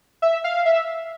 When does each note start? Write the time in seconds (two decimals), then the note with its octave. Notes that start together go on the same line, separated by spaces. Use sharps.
0.22 E5
0.44 F5
0.66 E5